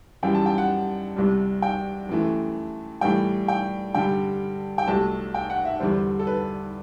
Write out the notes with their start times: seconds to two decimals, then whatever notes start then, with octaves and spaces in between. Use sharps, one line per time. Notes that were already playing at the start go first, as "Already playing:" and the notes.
0.23 F#2 E3 G3 G5
0.35 A5
0.46 G5
0.58 F#5
1.16 C2 C3 G3
1.62 G5
2.09 F#2 E3 A3
3.01 A2 E3 G3 G5
3.48 G5
3.95 G2 D3 G3 G5
4.78 G5
4.87 C2 C3 F#3 A3 A5
5.34 G5
5.50 F#5
5.65 E5
5.80 E2 D3 G3 C5
6.19 A4
6.27 B4